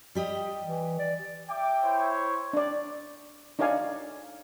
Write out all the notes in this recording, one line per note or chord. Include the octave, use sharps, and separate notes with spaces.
G3 G4 D#5
E3
D5
E5 G5 D6
E4 C5 C#5
D4 D5
D4 D#4 C#5 D5 F5 G#5